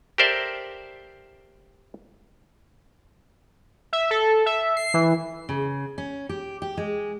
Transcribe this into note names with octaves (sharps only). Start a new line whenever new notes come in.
G4 A4 A#4 C5 D5 E5
E5
A4
E5
C7
E3
C#3
C#4
G4
G4
G#3